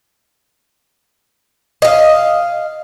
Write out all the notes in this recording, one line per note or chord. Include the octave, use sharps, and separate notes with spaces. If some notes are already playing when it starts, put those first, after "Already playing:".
D#5 F5